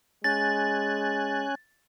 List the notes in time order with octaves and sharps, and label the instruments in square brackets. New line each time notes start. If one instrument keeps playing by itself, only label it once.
[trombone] G#3 [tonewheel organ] C#4 G#5 F#6 [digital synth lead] A6